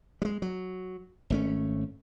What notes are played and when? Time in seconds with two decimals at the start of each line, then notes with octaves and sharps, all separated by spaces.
0.22 G3 G#3
0.42 F#3
1.30 G#1 A3 C#4